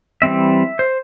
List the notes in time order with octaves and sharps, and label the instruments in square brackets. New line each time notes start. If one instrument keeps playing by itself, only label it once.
[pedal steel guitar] E3 G3 C4 E5
C5